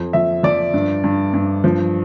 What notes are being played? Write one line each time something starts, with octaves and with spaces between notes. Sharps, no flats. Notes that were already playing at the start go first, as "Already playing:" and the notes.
Already playing: F2
F3 E5
F3 D5
G2
G2
G2
F3